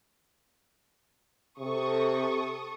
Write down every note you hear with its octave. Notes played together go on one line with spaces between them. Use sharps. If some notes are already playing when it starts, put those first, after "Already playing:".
C3 A4 C#6 D#6